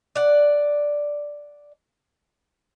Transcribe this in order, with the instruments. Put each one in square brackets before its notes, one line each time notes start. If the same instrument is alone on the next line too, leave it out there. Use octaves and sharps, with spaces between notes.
[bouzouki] D5 F#5